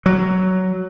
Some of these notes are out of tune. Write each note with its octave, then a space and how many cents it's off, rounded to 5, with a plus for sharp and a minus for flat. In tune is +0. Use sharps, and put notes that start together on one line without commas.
F#3 +10